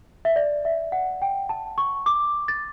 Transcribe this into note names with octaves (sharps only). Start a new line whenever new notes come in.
E5
D5
E5
F#5
G5
A5
C#6
D6
A6